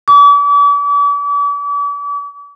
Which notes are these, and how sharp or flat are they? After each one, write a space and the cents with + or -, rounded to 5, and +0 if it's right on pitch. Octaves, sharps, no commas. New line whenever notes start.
D6 -40